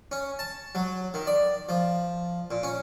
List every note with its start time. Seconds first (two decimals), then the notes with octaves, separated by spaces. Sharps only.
0.12 C#4
0.39 A5
0.75 F#3
1.14 D#3
1.27 D5
1.69 F3
2.51 A#2
2.63 C#4